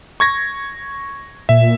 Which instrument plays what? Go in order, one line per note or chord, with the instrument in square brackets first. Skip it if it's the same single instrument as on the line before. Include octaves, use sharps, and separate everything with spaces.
[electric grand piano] C#6 G#6 A#6
[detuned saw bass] A#2 [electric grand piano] E5